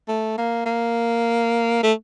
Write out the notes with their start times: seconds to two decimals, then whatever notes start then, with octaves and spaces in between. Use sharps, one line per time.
0.08 A3
0.37 A#3
0.66 A#3
1.83 A3